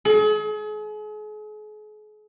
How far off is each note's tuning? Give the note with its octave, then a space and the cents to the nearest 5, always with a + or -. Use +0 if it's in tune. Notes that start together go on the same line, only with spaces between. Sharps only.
G#4 +40